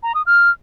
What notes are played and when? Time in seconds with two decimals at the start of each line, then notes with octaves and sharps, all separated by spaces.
0.03 A#5
0.14 D#6
0.26 F6